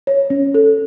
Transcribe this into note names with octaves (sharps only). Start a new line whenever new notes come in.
C#5
C#4
A4